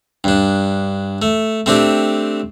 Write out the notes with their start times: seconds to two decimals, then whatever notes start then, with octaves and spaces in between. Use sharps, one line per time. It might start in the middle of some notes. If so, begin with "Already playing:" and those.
0.24 G2 D4
1.22 A3
1.66 A3 C4 D4 G4